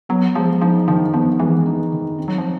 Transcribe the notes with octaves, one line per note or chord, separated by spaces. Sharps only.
F#3 B3
F3 G#3
F3 D#4
D#3 F3
F3 B3
E3 G#3
D#4
D#3
C4
F#3
F3